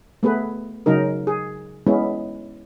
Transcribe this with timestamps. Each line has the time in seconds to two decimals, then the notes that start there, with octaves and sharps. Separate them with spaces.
0.23 A3 B3 G#4 B4
0.86 C#3 F#3 D#4 A#4
1.27 G#4
1.87 G#3 B3 C#4 E4